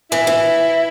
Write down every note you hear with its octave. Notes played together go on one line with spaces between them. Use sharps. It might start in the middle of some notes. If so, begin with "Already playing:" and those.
E3 E4
E3